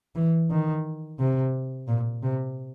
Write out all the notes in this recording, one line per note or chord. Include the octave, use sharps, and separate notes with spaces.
E3
D#3
C3
A#2
C3